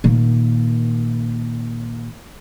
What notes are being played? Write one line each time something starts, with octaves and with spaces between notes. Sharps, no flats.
A#2 D#3